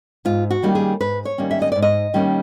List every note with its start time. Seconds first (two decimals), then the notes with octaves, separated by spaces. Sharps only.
0.25 G#2 F4
0.50 F#4
0.63 D#3 G3 A#3 C#4
0.75 G#4
1.01 G#2 B4
1.25 C#5
1.38 D#3 G3 A#3 C#4
1.51 E5
1.62 D#5
1.72 G#2 D5
1.82 D#5
2.14 D#3 G3 A#3 C#4